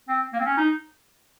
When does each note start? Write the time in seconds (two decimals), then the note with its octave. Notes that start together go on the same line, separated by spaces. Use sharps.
0.08 C4
0.33 A#3
0.40 C4
0.45 C#4
0.57 D#4